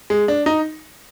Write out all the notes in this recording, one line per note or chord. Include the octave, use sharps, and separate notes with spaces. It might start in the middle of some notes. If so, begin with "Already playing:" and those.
G#3
D4
D#4